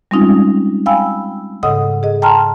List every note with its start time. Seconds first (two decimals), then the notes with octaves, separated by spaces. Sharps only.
0.11 G3 G#3 C4 C#4 D#4 F4
0.86 F5 G5 G#5 B5 E6
1.63 G#2 C#3 A4 D#5 F#5 D#6
2.03 G#4 D#5
2.22 G5 A5 A#5 C6 F6